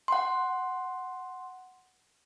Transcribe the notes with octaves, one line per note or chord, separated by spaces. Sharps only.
F#5 C6